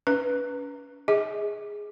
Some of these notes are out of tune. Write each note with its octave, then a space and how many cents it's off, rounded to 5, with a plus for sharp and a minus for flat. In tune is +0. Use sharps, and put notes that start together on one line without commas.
C#4 +35 B4 +0
G#4 +0 D#5 +45